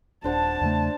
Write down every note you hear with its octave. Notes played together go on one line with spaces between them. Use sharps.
D#1 D4 C5 F#5 A5
E2 C#3 A3